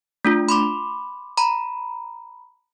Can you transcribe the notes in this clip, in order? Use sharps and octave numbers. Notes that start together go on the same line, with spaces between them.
A3 D4 F4
B5 C6 D6
A#5 B5